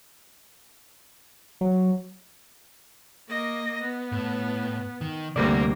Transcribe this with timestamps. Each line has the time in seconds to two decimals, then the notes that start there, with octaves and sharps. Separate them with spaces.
1.61 F#3
3.29 A#3 D#5
3.82 B3
4.12 A2
5.01 D#3
5.36 D2 C3 G3 A#3 C4 D5